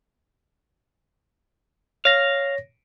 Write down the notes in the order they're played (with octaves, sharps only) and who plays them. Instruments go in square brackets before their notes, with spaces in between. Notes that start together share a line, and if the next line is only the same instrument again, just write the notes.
[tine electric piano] C#5 A#6 [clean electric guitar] F5